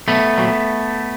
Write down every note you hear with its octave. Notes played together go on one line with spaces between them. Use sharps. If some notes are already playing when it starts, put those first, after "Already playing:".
B1 A3 B3
A#2 F#3